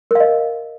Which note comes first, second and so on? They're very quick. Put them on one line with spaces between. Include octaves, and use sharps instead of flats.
A#4 F5 D#5